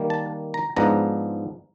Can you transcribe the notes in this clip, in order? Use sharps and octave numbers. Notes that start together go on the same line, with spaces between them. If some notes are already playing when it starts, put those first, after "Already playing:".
Already playing: D#3 G3 A#3
A5
A#5
G#2 F3 G#3 B3 D4 A#5